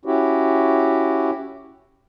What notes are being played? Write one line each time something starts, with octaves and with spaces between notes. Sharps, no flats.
C#4 E4 F#4 G4